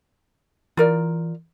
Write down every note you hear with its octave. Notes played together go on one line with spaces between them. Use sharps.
E3 F4 A#4 D5